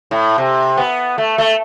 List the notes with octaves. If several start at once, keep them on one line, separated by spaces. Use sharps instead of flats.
A2
C3
B3
A3
A3